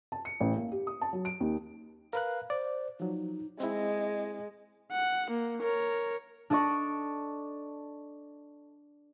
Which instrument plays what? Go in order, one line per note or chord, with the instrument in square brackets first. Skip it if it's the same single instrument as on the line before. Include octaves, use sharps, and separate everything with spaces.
[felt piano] A5
C#7
A1
A#3
G4
D#6
A5
F#3
D7
D#2
[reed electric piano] A#4 B4 F#6 [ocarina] F5
[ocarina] C5 [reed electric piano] D5
[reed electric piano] F3 F#3 [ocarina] D#4
[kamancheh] G#3 [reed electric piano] C4 E4 [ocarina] D#5
[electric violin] F#5
A#3
A#4 C#5
[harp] D4 A4 D5 D#5 C#6